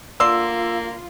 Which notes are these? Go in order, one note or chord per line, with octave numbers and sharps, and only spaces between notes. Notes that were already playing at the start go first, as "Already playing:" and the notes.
D3 A#3 F4 D5 C6 E6